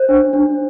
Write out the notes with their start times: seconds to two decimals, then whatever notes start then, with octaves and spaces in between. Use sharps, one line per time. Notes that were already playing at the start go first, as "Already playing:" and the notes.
Already playing: C5
0.09 D4
0.33 D4